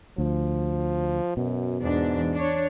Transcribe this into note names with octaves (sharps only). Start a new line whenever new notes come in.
D2 F3
F#2 B2
E2 G#2 D4
D4 C#5